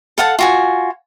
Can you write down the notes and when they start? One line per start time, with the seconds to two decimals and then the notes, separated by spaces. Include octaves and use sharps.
0.18 A4 F5 F#5 A5
0.39 F4 F#4 G#5